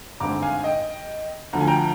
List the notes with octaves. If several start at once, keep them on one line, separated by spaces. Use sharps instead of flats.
G#1 G2 D3 G#3 C4 A#5 D6
F5 G#5
D#5 G5
D2 D3 F3 A#5
G#5
G5 A#5